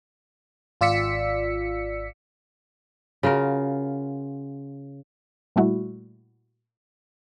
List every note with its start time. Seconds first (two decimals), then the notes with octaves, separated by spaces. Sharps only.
0.81 G#1 F4 D5 E6 B6 C#7
3.23 C#3 F4 F#4 A#4
5.56 A#2 G3 A3 E4 F#4